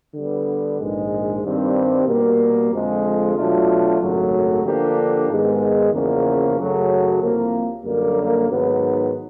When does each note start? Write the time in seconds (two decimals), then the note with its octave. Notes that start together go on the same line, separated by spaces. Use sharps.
0.14 D3 G3 B3
0.79 A#1 G#2 D#3 G#3
1.43 G2 D#3 G3 C4
2.07 B2 G3 A#3
2.72 F2 D3 F3 G#3
3.36 B2 F#3 A3 D4 F4
4.00 G#1 F#2 C#3 F#3 A3
4.64 D3 F3 A#3 D4 G4
5.29 G#2 D#3 G#3 B3
5.93 E2 C#3 F3 A#3 C#4
6.57 F#2 C#3 F#3 A3
7.21 C2 C3 F3 A#3
7.85 F#2 D3 G3 A#3
8.50 G#2 D#3 F#3 B3